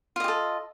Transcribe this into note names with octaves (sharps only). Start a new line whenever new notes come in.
F4 G4 A4 D#5